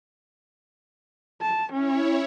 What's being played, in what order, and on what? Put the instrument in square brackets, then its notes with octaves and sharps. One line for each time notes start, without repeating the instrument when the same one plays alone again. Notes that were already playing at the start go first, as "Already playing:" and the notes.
[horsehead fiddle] A5
[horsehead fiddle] C#4 [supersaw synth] E4 C#5